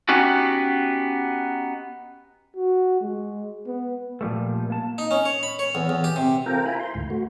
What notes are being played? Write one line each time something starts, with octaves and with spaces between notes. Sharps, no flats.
B3 C#4 D#4 F#4 G4
F#4
G#3
B3
A#2 F3 G3 A3
A#3 A5
D#4
C#4
C#5
B5
C#5
E2
E2
G4
C3
C4 F4 A4 A#4 G5 A#5
E4 F4 G#5 A#5 B5
C6
D2 G#2
A3 F#4